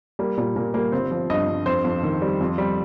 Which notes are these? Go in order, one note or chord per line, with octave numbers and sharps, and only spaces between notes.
G3 A#3
A#2 G3
A#2 A#3
G3 A#3
G1 C4
F3
G2 D#5
G2
F2 C5
F2
D#3
G3
F2
G3